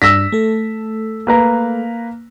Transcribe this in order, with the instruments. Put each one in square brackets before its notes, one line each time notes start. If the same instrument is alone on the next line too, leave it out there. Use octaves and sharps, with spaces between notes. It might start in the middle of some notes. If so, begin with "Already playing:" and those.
[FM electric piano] G2 D4 [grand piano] E6 A#6 B6
[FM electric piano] A3 A4
[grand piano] A#3 B4 A#5